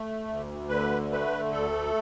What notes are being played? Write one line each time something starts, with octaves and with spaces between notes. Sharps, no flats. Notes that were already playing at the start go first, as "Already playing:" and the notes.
Already playing: A3
D2
D3 B4
A3 B4
D2 A4